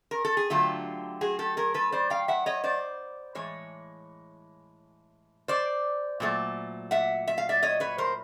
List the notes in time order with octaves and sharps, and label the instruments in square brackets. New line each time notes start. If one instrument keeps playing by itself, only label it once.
[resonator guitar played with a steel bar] A#4
A4
G#4
D3 F#3 A3 F4 G4
F#4 G#4
G4 A4
G#4 A#4
A4 B4
C5 D5
F5 G5
E5 F#5
C#5 D#5
C5 D5
A2 E3 G#3 C#5
C5 D5
A#2 F#3 A3
E5 F#5
E5
F5
D5 E5
C#5 D#5
B4 C#5
A#4 C5